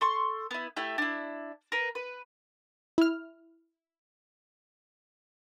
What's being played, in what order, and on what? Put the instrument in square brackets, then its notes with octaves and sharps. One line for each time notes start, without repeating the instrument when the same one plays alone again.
[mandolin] A4 C6 C#6
B3 E4
A3 E4 G4
D4 E4
A#4 B4
B4
[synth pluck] E4 F6